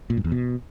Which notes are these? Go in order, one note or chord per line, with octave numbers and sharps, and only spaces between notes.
A#2
G2
E2
B2